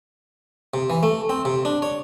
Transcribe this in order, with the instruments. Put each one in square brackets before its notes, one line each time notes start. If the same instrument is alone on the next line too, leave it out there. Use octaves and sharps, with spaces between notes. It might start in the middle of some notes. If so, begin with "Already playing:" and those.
[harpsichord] C3
E3
A3
C4
C3
D4
C#5